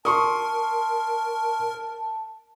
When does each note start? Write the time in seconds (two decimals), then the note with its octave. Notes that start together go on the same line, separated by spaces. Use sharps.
0.05 A#4 A5 C6 C#6 D#6